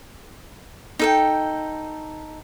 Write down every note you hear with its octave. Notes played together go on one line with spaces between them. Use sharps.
D#4 A4 G5